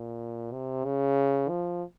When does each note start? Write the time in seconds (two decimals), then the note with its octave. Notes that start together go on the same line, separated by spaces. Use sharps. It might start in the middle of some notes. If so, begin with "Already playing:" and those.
Already playing: A#2
0.53 C3
0.85 C#3
1.49 F3